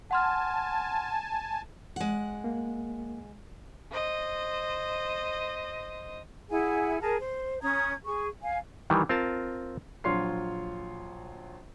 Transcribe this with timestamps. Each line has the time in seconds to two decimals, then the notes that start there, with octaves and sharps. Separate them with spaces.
0.11 F#5 G#5 A5 C6 F6
1.96 G#3 F#5
2.44 A#3
3.91 C5 D#5
6.50 E4 G#4 F#5 G#5
7.01 G#4 A#4 A5
7.21 C5
7.62 C#4 A#5 D#6 G#6
8.04 G#4 C#6
8.42 F5 G#5
8.90 D#3 E3 G3
9.09 C4 F4 A#4 A5
10.04 A#1 F#3 F4 C#5 C6 C7